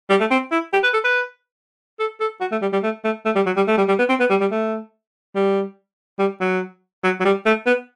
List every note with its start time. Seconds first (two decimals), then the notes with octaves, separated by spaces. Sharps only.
0.10 G3
0.20 A3
0.31 C4
0.52 E4
0.73 G4
0.83 B4
0.94 A4
1.04 B4
2.00 A4
2.20 A4
2.41 F#4
2.51 A3
2.62 G3
2.73 G3
2.83 A3
3.04 A3
3.25 A3
3.35 G3
3.46 F#3
3.56 G3
3.68 A3
3.77 G3
3.88 G3
3.99 B3
4.09 C4
4.20 B3
4.30 G3
4.41 G3
4.51 A3
5.36 G3
6.19 G3
6.41 F#3
7.04 F#3
7.20 F#3
7.25 G3
7.46 A3
7.66 B3